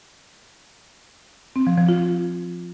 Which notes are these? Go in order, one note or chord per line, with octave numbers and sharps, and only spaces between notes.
C4
F3
F3
F4